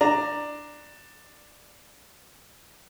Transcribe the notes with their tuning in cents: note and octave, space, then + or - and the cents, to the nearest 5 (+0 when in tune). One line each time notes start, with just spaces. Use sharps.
D4 +10 A#5 +0